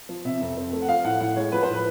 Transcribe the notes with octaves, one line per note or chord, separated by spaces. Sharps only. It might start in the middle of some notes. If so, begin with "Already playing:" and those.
F3
C3 E5
F2
C4
A3
F#5
F3 F5
A2 F#5
A2 F#5
G#3 C#5
F3 B4
C5
A2 B4